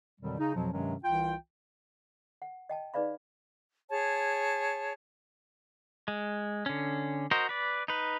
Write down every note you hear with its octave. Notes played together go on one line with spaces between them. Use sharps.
F2 B2 D3 D#3 F#3 G3
C#3 D#4
F2 B2 F3 F#3
G2 C3 D#3 F#3 G#3 C#4
C2 E3 F4 G5
F#5
D#5 G5 A5
D#4 G#4 B4 D5 F5 B5
G#4 C#5 A5
G#3
D3 C#4
F#4 A#4 C5 D#5
B4 D5
D#4 B4